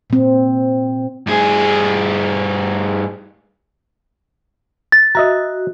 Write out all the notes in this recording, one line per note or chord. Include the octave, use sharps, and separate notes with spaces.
A#2 C4
G2 G#4
A6
F#4 D#5 E5 A#5